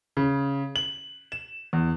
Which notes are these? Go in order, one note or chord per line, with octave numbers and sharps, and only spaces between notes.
C#3
F#7
E7
E2